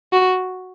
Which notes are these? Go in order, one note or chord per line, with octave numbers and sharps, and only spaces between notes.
F#4